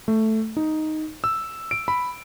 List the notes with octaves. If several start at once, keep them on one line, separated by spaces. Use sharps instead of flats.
A3
D#4
E6
D7
B5